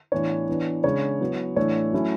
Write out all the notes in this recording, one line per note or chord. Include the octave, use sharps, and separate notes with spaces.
A2 E3 B3 D4 C#5
E3 B3 D4
C#3 G#3 D4 C#5
F#3 B3 E4
A2 E3 A3 D4 C#5
F#3 A3 C#4 E4